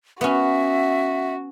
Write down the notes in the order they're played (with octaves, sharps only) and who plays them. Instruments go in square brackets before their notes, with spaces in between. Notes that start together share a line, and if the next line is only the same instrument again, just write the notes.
[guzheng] B3 C#4 [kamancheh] F#4 [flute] E5